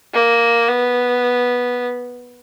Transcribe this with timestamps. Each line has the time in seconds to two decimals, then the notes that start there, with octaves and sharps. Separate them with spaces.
0.14 A#3
0.68 B3